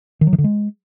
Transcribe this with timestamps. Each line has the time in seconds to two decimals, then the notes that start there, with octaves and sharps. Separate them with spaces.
0.21 D#3
0.27 F#3
0.33 D#3
0.38 D3
0.44 G#3